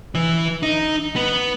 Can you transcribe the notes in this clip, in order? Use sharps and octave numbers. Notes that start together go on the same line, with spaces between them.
E3
D#4
B3